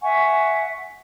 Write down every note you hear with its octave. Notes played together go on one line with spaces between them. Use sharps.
E5 F#5 G#5 C#6